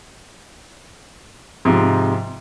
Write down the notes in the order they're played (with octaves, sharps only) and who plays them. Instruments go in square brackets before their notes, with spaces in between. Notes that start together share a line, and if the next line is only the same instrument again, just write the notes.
[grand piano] G#2 C3 F3